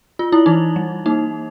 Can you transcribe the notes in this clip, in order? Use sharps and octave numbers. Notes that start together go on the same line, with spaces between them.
F4
E4
E3 D#4
G3
A#3 D#4